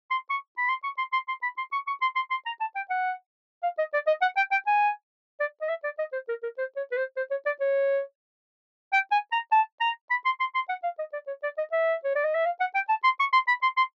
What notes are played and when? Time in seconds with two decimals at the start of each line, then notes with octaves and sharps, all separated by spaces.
0.11 C6
0.30 C#6
0.58 B5
0.69 C6
0.84 C#6
0.98 C6
1.13 C6
1.28 C6
1.43 B5
1.58 C6
1.73 C#6
1.87 C#6
2.02 C6
2.16 C6
2.31 C6
2.46 A#5
2.60 A5
2.76 G5
2.90 F#5
3.63 F5
3.78 D#5
3.93 D5
4.07 D#5
4.22 F#5
4.37 G5
4.52 G5
4.67 G#5
5.40 D5
5.62 D#5
5.69 E5
5.84 D5
5.99 D#5
6.13 C5
6.29 A#4
6.43 A#4
6.58 C5
6.76 C#5
6.92 B4
6.97 C5
7.17 C5
7.31 C#5
7.46 D5
7.61 C#5
8.93 G5
9.12 G#5
9.32 A#5
9.52 A5
9.81 A#5
10.10 B5
10.25 C6
10.40 C6
10.55 C6
10.69 F#5
10.84 F5
10.99 D#5
11.13 D5
11.27 C#5
11.43 D5
11.58 D#5
11.72 E5
12.04 C#5
12.15 D5
12.24 D#5
12.35 E5
12.45 F5
12.60 F#5
12.75 G5
12.89 A5
13.04 C6
13.20 C#6
13.33 C6
13.48 B5
13.63 C6
13.77 C6